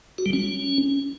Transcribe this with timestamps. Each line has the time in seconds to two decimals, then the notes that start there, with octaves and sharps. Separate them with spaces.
0.18 F#4
0.26 G3
0.33 C#4